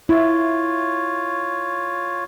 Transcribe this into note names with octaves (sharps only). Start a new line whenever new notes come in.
E4 F4 C#5